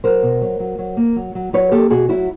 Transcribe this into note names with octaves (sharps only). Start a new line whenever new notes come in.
F#3 A#4 C5
B2
F#3
F#3
F#3
A#3
F#3
F#3
F#3 B4 C#5
A#3 G4 A4
B2 F#4 G#4
F#3 E4 F#4